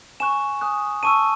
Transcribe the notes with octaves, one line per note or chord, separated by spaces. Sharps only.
G#5 C#6 F#6 E7
G#5 D#6 F#6
A5 C#6 E6 D#7